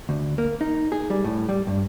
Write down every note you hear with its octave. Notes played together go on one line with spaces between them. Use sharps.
D2
A#3
D#4
G#4
G3
A2
G3
G2